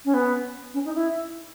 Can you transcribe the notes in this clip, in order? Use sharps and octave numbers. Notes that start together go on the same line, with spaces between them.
C#4
B3
C#4
D#4
E4